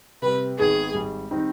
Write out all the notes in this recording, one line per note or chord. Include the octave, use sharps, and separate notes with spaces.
C3 G3 C4 B4
G#1 G#2 D#3 G#3 B3 G#4
G#1 G#2 G3
D#3 G3 C4 D#4